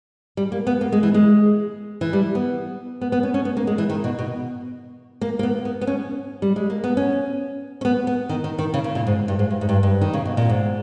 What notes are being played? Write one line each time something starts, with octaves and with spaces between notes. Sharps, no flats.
G3
A#3
B3
A#3
G#3
E3
G#3
E3
G3
B3
B3
B3
C#4
C#4
B3
A#3
G#3
E3
D#3
B2
B2
A#3
A#3
B3
B3
B3
C#4
G3
G#3
A#3
B3
C#4
C#4
B3
B3
D#3
D#3
D#3
C#3
C#3
A#2
G#2
G2
G#2
G2
G#2
G2
G2
D#3
C#3
B2
A#2
G#2